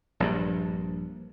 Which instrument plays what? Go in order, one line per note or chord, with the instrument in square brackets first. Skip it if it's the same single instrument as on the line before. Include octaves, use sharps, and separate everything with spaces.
[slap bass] A#1 G2